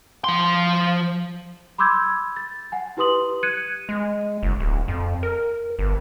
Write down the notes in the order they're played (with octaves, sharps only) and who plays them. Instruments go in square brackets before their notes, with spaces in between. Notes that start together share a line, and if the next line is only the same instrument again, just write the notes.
[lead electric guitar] F3 C6
[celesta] B5 C6 D6 E6 G6 G#6
A6
F#5 G#5
E4 G4 B4 C6 D#6 F#7
F#6 G#6 C#7 D#7
[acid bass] G#3
F#1
D1
F2
A#4
G1